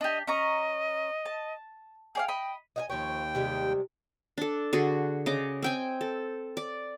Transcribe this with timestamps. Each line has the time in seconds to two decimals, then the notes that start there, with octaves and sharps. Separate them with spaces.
0.01 D4 G4 D#5
0.27 C#4 D#5 A#5 C#6
1.25 A5
2.15 G#4 D5 F5 G5
2.28 D#5 B5
2.76 D#5 F5 G#5
2.90 D#2 F3 C#5 G5
3.35 C3 G3 G#3
4.38 D4 A4
4.73 D3 F#4 G#4
5.26 C#3 D#5 D6
5.62 C4 G5 G#5
6.01 A4
6.57 D5